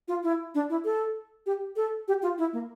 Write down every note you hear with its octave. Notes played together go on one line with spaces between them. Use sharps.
F4
E4
D4
E4
A4
G4
A4
G4
F4
E4
A#3